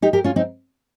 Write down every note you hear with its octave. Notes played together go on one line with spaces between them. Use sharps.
D#4 G4
G4 A#4
C#4 F4
C4 D#4